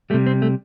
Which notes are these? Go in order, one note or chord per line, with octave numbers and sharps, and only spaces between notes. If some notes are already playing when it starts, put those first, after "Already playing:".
C3 G3 A3
C4
A3